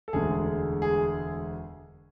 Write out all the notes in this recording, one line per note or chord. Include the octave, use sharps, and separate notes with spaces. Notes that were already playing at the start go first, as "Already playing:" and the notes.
A4
E1 D2 D3 G#3 G#4
G#4